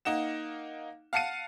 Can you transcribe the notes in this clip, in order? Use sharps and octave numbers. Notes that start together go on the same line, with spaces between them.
A#3 D#4 F#5 E7
F5 F#5 A5 C7 C#7 D#7